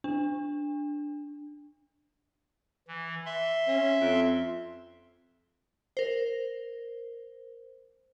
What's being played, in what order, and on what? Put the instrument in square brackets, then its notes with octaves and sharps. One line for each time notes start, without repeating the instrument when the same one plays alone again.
[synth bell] D4
[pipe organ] E3
E5 C6
[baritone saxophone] C#4
F2
[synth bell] A#4 C5